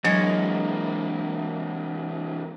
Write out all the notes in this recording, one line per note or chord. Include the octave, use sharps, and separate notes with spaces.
C3 E3 F#3 G#3 A#3 C#5